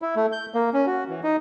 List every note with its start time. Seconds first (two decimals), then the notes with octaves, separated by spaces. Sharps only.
0.02 E4
0.16 A3
0.32 G6
0.54 A#3
0.74 C#4
0.86 F#4
1.09 E3
1.23 D#4